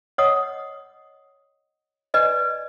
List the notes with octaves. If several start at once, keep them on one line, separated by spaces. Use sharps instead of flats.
C#5 D#5 F#5 D#6
B4 D5 D#5 G#5